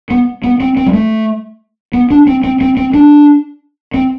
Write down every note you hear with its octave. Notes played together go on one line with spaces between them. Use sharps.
B3
B3
C4
C4
G3
A3
B3
D4
C4
C4
C4
C4
D4
C4